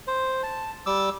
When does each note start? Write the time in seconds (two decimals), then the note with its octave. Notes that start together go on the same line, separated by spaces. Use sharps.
0.07 C5
0.43 A5
0.86 G3 D6 E6